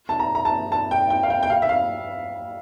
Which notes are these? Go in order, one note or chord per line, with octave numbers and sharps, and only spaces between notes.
A5
A#5
A#5
A5
A5
G5
G5
F5
G5
G5
F5
E5
F5